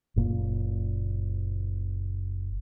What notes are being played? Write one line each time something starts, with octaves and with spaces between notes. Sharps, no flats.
F#1 A#2 A#3